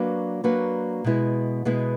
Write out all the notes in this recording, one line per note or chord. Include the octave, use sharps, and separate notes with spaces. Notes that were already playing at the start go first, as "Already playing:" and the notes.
Already playing: F#3 A#3 D4 F#4 B4
F#3 A#3 D4 F#4 B4
B2 G#3 B3 E4
B2 G#3 B3 E4